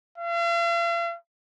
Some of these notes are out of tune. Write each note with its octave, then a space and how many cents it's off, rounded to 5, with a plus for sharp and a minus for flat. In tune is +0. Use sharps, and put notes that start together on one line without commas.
F5 -45